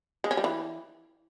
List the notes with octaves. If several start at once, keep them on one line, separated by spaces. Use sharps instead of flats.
G#3
C#4
G3
E3